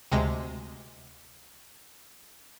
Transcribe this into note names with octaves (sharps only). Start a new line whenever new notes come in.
D2 C3 G#3 A#6